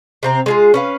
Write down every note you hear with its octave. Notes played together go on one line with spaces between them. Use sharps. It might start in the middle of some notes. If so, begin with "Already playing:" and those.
C3 C4 A#5
G#3 F4 G#4
C#4 B4 F5